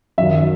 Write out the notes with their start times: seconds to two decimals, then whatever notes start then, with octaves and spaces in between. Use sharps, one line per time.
0.18 F#2 D#3 F#3 E5